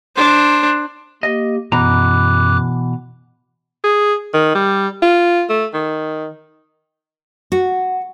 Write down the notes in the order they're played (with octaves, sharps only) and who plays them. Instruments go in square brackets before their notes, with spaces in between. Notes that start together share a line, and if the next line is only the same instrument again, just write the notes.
[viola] D4 C5
[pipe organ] A#3 G4 [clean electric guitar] D#5
[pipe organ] F#2 D6 F#6 [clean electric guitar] B2 E3 A#5
[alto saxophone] G#4
D#3
G3
F4
A3
D#3
[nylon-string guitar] F#4